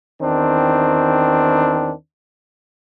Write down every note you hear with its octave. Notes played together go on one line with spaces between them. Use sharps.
E2 D#3 C4 D4